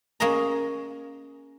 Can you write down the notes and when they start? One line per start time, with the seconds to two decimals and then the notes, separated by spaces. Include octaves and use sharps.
0.20 A#3 C#4 G#4 D#5 A#5